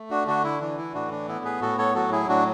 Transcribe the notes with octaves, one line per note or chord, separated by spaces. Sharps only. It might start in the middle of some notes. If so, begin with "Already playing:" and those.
Already playing: A3
D4 F#4
D3 D4 F#4
E4
E3 D4
E4
A2 D4 F#4
D4
B3 E4
G#4 B4
A2 F#4 A4
A4 C#5
F#3 F#4 A4
E4 G#4
A2 D4 F#4